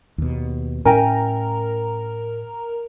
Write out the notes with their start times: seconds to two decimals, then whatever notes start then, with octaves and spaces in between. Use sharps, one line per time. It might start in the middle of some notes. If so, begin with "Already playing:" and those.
0.18 D#2 B2
0.85 A2 C#4 A#4 E5 G5 G#5 A#5